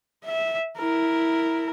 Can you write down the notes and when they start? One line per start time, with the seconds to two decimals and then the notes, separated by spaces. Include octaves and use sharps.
0.25 E5
0.78 E4 A#4